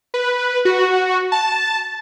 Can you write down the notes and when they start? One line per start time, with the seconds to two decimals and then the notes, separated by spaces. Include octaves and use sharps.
0.14 B4
0.65 F#4
1.32 A5